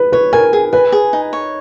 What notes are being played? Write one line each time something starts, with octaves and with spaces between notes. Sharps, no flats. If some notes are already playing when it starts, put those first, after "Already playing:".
Already playing: B4
B4 C#5
A#4 G#5
G#4
B4 G#5
G#4
D#4
C#5